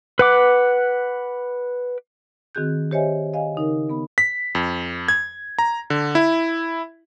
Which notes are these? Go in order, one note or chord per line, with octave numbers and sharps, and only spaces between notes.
B4 F#5 D6
D#3 C4 F#4 G#4 F#6 G6
G4 C5 C#5 D#5 E5 G#5
D#5 F5 G#5
C#3 D#4 A#4
B3 B5
B6
F2
G#6
A#5
D3
E4